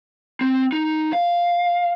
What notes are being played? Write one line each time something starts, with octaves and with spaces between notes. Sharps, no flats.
C4
D#4
F5